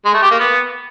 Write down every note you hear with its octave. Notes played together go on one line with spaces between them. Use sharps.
G#3
A3
G4
A#3
B3